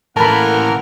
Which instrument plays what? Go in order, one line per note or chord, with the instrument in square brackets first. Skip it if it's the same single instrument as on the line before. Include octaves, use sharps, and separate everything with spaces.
[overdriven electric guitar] A2 E3 [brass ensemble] A#3 F#5 [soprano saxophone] A#4 [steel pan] A5 B5